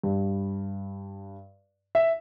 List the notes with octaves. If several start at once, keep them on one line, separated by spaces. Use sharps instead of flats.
G2
E5